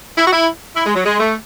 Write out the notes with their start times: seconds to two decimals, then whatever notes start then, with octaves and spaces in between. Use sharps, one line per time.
0.18 E4
0.27 F#4
0.33 E4
0.76 E4
0.86 G#3
0.96 F#3
1.06 G#3
1.20 A3